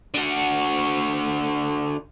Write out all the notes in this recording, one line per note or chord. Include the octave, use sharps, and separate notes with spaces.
D3 F#4